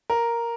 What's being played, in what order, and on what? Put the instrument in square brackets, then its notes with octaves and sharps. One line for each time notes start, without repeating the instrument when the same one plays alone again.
[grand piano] A#4